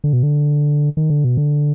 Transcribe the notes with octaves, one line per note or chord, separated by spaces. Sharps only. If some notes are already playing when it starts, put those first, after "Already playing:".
D3
B2
D3
D#3
D3
B2
D3